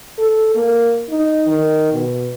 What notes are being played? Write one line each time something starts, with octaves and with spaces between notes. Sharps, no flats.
A4
A#3
D#4
D#3
B2